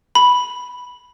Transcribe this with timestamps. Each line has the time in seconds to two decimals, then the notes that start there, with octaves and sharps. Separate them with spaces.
0.15 B5